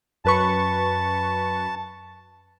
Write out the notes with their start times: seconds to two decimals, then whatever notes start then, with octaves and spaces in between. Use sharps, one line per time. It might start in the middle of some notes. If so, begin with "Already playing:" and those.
0.25 F#2 B4 A5 C#6